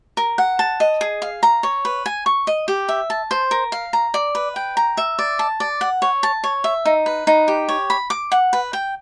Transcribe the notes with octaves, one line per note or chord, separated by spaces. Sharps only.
A#4
F#5
A5
D#5
G#4
F5
A#5
C#5
B4
G#5
C#6
D#5
G4
E5
A5
C5
A#4
F5
A#5
D5
B4
G5
A#5
E5
D5
A5
D5
F#5
C#5
A5
C#5
E5
D#4
B4
D#4
G4
C#5
B5
D6
F#5
B4
G5